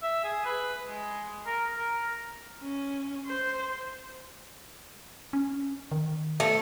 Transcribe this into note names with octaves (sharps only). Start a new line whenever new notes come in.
E5
G#4
B4
G#3
A#4
A#4
C#4
C5
C#4
D#3
A3